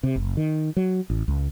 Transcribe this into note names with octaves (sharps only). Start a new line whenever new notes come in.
C3
F#1
D#3
F#3
A1
C#2